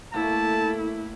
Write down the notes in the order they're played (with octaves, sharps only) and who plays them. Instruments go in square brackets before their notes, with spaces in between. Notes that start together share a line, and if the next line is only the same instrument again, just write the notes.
[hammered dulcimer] A2 A3 A#3 [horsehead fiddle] E4 [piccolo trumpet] A5